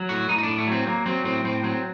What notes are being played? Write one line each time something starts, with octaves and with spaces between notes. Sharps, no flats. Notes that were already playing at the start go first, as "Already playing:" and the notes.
Already playing: F#3
A2 F#4
A2 D#4
D#4
A2 D4
A3
F#3 C4
F#3 A#3
F#3 C4
A2 C4
A2 C4
F#3 C4